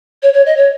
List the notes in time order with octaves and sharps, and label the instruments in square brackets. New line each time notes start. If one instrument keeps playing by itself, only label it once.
[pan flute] C#5
C#5
D#5
C#5